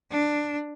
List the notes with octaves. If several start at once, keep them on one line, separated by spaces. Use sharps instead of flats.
D4